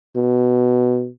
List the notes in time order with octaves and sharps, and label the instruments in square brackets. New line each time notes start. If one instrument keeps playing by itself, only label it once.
[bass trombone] B2